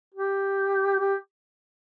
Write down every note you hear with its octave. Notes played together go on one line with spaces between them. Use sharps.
G4
G4